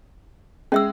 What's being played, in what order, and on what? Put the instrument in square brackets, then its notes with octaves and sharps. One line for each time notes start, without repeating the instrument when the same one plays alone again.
[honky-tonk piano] G#3 [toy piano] C#4 E5 E6